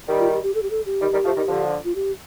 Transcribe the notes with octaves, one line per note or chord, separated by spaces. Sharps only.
D#3 G3
F4
G4
G4
A4
G4
A4
G4
D#3 G3
D#3 G3
F3 A3
D#3 G3
D3 F3
F4
G4